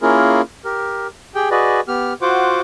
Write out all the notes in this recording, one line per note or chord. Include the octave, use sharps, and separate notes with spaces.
A#3 C#4 E4 F4 G#4 A#4
G4 A#4
G4 G#4 G5
F#4 G#4 B4 D5 D#5
B3 G4 F6
F4 F#4 C5 F#5 D6